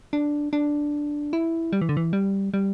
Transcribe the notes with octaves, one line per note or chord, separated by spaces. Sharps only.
D4
D4
E4
G3
E3
D3
E3
G3
G3